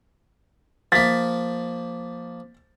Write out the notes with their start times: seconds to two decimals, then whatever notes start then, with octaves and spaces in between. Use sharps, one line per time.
0.92 F3 A#3 A6 B6